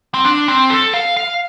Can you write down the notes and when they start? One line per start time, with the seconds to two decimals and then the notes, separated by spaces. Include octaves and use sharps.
0.14 C4
0.25 D4
0.48 C4
0.70 A4
0.94 F5
1.17 F5